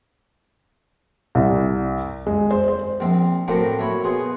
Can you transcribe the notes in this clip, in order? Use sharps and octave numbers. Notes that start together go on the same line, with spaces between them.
C2
G#3
C5
C5
A#1 C4 E5
A2 F#3 A3 A#3 C4
E4 C#5 E5
B2 G#4 C6